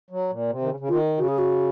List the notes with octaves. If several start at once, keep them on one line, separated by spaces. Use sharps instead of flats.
F#3
A#2
C3
D#3
C#3
C#3
D#3 F4
C#3 F#4
G#4
F#4